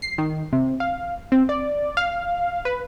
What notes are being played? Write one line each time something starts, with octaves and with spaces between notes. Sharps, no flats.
C7
D#3
C3
F5
C4
D5
F5
B4